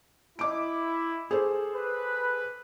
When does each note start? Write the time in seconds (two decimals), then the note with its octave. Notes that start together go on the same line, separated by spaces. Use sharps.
0.39 E4 D#5 D6 D7
1.31 G#4 A4 C5
1.76 B4